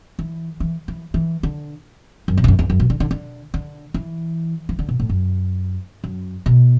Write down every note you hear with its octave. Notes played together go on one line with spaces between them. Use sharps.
E3
E3
E3
E3
D3
F#2
B2
E2
F#2
E2
F#2
B2
D3
D3
D3
D3
E3
E3
D3
B2
A2
F#2
F#2
B2